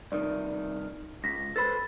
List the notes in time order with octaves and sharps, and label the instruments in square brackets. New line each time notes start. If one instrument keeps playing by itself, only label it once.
[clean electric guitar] C2 D#3 [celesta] D5
[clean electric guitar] C#2 [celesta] A#6 B6
[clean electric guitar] A4 B4 C5 [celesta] B5 A6